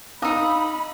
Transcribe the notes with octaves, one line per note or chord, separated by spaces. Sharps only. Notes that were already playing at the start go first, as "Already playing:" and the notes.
D#4 F5 A#5 B5 D#6 E6